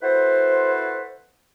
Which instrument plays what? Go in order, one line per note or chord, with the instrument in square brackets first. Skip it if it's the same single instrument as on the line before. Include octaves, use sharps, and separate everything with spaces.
[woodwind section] E4 F#4 A4 B4 C5